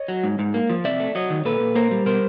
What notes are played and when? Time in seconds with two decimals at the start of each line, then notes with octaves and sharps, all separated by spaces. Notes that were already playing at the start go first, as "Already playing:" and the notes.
Already playing: C#5 D#5
0.08 F#3
0.24 G#2
0.39 G#2
0.54 A#3
0.69 F3
0.84 C3 D5 E5
1.00 A3
1.15 F#3 C#5 D#5
1.30 D#3
1.45 A#2 A4 B4
1.60 A#2
1.75 A#3 A#4 C5
1.91 G3
2.06 B2 A#4 C5